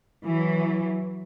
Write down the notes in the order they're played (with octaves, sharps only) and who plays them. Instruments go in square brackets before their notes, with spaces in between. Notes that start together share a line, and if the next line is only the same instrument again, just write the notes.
[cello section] E3 F#3